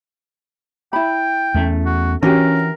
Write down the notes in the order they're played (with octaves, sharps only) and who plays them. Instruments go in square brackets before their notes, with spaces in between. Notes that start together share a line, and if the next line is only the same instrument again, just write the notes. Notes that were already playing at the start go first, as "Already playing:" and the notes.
[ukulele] E4 B5 [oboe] G5
[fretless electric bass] E2 A3 C#4
[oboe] F#4
[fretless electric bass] E3 [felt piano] C#4 [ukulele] D4 F#4 G4 [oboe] A#4